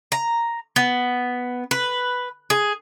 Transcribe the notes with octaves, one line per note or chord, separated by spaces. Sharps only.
A#5
B3
B4
G#4